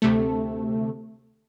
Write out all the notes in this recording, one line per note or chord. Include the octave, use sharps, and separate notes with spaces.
D2 C3 A3